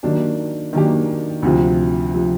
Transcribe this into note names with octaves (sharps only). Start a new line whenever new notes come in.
D#3 F#3 A#3 D4 G4
D#3 F#3 A#3 D4 G4
D2 C3 F3
C3 F3